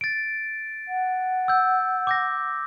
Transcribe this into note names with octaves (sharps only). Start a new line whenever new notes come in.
A6 D7
F#5
E6 G6
D6 G6 A#6